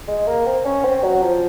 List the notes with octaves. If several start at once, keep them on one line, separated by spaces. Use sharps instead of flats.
G#3
A#3
C4
C#4
C4
F#3
F3